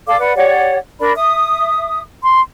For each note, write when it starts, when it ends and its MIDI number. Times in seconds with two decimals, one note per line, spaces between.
0.07 0.18 69
0.07 0.18 74
0.07 0.18 77
0.07 0.18 86
0.20 0.35 71
0.20 0.35 74
0.20 0.35 78
0.36 0.77 67
0.36 0.77 73
0.36 0.77 74
0.36 0.77 78
0.99 1.12 62
0.99 1.12 70
0.99 1.12 74
0.99 1.12 83
1.16 2.00 76
1.16 2.00 87
2.22 2.40 84